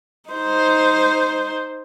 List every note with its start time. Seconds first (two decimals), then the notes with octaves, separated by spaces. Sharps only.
0.30 D#4 C5